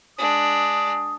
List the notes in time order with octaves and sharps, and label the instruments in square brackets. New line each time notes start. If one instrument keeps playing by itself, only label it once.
[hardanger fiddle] G#3 D4 [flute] D#6